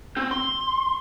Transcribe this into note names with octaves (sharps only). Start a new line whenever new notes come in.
C4
C6